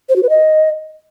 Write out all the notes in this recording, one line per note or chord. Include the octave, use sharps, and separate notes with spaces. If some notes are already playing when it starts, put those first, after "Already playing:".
C5
F#4
B4
D#5